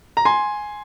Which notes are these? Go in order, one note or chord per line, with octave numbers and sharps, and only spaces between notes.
A#5
G#5 C6